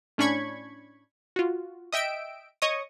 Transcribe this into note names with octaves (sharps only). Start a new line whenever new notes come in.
A2 C#4 D4 B5 C#6 G#6
F4 F#4
D#5 E5 G5 E6 D7
C#5 D#5 C#6 D#6